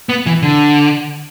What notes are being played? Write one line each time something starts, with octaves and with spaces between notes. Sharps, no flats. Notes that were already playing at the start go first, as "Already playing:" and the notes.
B3
E3
D3